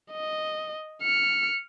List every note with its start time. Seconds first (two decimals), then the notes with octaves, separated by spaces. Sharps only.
0.12 D#5
1.02 F6 C#7